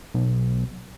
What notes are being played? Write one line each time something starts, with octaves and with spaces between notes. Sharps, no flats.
B1